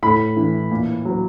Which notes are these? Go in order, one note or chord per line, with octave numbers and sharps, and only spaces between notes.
A2 B5
E3
A#2
F#3